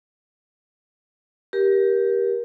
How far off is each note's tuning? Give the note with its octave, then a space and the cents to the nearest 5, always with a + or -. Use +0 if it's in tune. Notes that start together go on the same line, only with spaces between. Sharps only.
G4 +0 A#4 +25